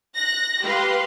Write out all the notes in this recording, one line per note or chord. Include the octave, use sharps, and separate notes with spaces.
F#6 A#6
G4 B4 F5 C6